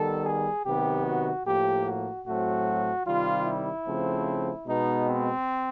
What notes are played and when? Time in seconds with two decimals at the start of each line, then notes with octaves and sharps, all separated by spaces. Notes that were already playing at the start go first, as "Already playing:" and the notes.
Already playing: D#3 G3 B3 A4
0.26 G#4
0.66 C3 D#3 F#3 B3 G4
1.06 F#4
1.45 A2 F3 A#3 G4
1.86 F#4
2.27 A2 F#3 A3 C4 F#4
3.06 C3 D#3 G3 F4
3.46 E4
3.87 C#3 F3 A3 C4
4.66 B2 G#3 B3 D#4
5.06 C4